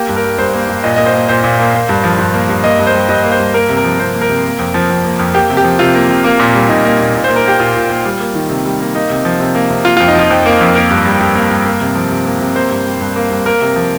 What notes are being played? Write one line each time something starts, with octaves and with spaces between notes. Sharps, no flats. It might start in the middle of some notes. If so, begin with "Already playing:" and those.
Already playing: A#3 G4
G2
A#4
G3
G2 C5
A#3
G2
A#2 D#5
A#3 D#5
C5
A#3
A#2 C5
A#2
A#3
A#3
G2
F3
G2
A#3
G2
A#3 D#5
G2
C5
G3
G2 D#5
A#3
C5
G2
A#3 A#4
C3
A#4
F3
C3 C5
A#3
A#4
C3
A#3
F2
F3
F2
A#3
F2
A#3 G4
C3
G4
F3
C3 F4
A#3
C3
A#3
A#2
G3
A#2 D#4
A#3
A#2
A#2
C5
A#3
A#4
A#3 G4
A#2 F4
A#2
A#3
G3
A#3
D#3
C3
G3
A#3
A#3 D#4
C3
F3
C3
A#3
C3
A#3 F4
F2 F4
D#4
F3 F4
F2
A#3
F2
A#3 A#4
G2
G3
G2
A#3
G2
A#3
C3
F3
C3
A#3
C3
A#3 C5
G2
G3
G2
A#3
G2
A#3 A#4
C3
F3